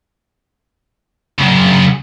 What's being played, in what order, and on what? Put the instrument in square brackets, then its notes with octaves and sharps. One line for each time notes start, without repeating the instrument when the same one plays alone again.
[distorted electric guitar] F#2 C#3